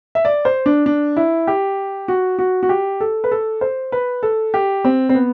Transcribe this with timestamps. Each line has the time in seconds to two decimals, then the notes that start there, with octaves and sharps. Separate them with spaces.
0.15 E5
0.25 D5
0.45 C5
0.66 D4
0.86 D4
1.17 E4
1.47 G4
2.08 F#4
2.39 F#4
2.63 F#4
2.69 G4
3.00 A4
3.24 B4
3.31 A4
3.61 C5
3.92 B4
4.23 A4
4.54 G4
4.84 C4
5.09 C4
5.15 B3